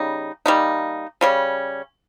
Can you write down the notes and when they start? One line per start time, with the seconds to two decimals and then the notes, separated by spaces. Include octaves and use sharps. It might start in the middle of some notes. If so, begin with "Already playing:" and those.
Already playing: C#3 G3 D#4
0.46 G3 A#3 D#4
1.21 C#3 G3 C#4